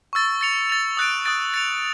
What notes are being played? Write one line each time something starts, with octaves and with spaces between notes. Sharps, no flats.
C#6 E6 A6
A6 C#7 F7
A6 C#7 F7
D#6 F#6 A6 D7
D#6 F#6 A6 D7
A6 C#7 F7